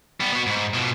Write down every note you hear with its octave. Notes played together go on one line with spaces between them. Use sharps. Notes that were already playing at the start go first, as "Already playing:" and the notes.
G3 B3
B3 F#4
G#2
B2 F3